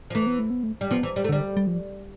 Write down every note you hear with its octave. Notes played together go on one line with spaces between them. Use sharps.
F3
E3 A3
B3
A3
B3
A3
G3
F3 B3
E3
G3
A3
D3 G3
G3
F3